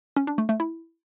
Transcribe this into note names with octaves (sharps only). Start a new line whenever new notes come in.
C#4
D4
A3
A3
E4